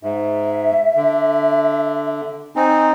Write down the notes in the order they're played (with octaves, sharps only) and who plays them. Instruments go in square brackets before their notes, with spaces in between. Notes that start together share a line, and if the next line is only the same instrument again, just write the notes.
[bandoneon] G#2 [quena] E5
[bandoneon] D3
[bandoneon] C4 D#4 [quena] G#5